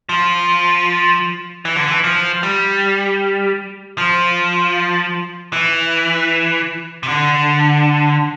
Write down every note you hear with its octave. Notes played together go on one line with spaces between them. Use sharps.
F3
E3
D3
E3
F3
G3
F3
E3
C3
D3